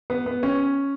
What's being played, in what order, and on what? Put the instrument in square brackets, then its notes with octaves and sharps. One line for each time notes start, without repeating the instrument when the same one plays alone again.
[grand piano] B3
B3
C#4